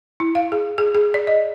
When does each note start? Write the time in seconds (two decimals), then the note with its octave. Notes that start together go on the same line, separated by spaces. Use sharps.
0.20 E4
0.35 F5
0.52 G#4
0.78 G#4
0.95 G#4
1.14 D5
1.27 D#5